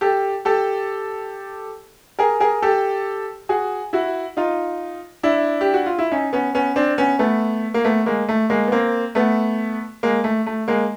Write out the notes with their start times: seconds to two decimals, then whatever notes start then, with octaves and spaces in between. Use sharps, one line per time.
0.01 G4 A4
0.45 G4 A4
2.19 G#4 A#4
2.40 G#4 A#4
2.62 G4 A4
3.49 F#4 G#4
3.93 E4 F#4
4.37 D#4 F4
5.23 D4 E4
5.61 G4
5.74 F#4
5.86 F4
5.98 E4
6.11 C#4 D#4
6.33 B3 C#4
6.55 B3 C#4
6.76 C4 D4
6.98 B3 C#4
7.19 A3 B3
7.74 A#3
7.84 A3 B3
8.06 G#3 A#3
8.29 A3
8.50 G#3 A#3
8.67 B3
8.72 A#3 C4
9.15 A3 B3
10.03 G#3 A#3
10.24 A3
10.46 A3
10.68 G#3 A#3